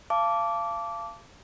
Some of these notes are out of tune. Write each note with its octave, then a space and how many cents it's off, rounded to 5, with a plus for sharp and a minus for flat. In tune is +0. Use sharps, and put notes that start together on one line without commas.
F5 -30 A5 +0 D6 -20